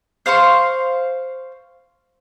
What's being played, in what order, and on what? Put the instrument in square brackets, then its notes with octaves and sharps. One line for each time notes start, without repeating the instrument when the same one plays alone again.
[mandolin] C5 F5 C6 C#6